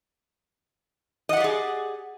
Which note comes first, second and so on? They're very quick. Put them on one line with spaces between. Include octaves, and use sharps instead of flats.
D#5 F#5 G4 D5 G#4